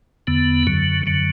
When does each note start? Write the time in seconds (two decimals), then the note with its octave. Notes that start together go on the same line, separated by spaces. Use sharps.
0.27 E2 D3 B3
0.67 F#2 D3 F#3
1.06 F#2 D3 F#3